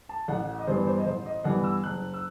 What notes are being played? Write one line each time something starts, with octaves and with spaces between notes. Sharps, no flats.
A5
A1 F#5
D#5
G2 E3 G3 B3 C5
B4
C5
D#5
A1 C5
D#5
G2 E3 G3 B3 F#5
E6
F#1 F#6
E6